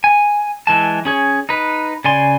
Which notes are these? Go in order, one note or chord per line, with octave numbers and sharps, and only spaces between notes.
G#5
E3 G#3 A5
C#4 G#4 C#5
D#4 B4
C#3 D5 G#5 C6